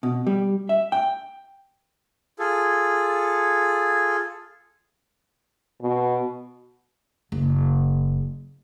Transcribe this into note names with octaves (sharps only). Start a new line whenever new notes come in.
B2
G3
E5
G5
F4 G#4 A4
B2
F#1